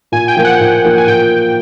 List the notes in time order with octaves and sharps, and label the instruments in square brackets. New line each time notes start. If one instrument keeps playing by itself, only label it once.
[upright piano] A#2 [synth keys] G#5
[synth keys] G5
[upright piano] F3 A#3
[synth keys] F#5
[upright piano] A#2
F3 A#3
[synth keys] G#5
[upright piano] A#2 [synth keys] G5